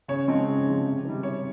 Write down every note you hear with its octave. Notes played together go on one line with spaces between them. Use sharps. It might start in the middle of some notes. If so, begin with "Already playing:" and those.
C#3 C#5
F3 G#3 C4 D#4
C#3
F3 G#3 C4 D#4
C3
D#3 G3
C3 C#5